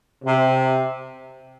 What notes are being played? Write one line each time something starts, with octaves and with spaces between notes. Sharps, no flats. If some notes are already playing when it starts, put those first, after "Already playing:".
C3